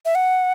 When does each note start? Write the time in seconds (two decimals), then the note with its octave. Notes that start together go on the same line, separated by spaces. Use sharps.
0.05 E5
0.15 F#5